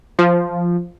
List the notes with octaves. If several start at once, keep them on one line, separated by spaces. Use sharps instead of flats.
F3